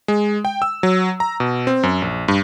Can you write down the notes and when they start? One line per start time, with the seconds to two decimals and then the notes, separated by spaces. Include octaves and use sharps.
0.08 G#3
0.45 G5
0.62 E6
0.83 F#3
1.20 A#5
1.40 B2
1.67 C4
1.83 F#2
2.02 A#1
2.28 G2